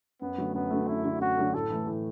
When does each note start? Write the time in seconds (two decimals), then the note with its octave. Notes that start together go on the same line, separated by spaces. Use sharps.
0.21 F#2 B3
0.38 D3 F#3 A3
0.54 F#2 B3
0.71 D3 F#3 A3
0.87 F#2 E4
1.04 D3 F#3 A3
1.21 F#2 F#4
1.37 D3 F#3 A3
1.53 A2 A4
1.70 E3 A3
1.87 A2